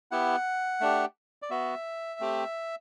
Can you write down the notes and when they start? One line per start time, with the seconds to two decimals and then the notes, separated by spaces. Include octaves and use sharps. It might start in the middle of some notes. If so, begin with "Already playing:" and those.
0.11 B3 E4 G4 F#5
0.81 A3 D4 G4
1.42 D5
1.50 B3 F#4 E5
2.20 A3 C4 G4